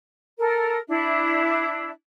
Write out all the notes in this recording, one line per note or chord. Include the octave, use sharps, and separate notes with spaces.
A4 A#4
D4 E4 E5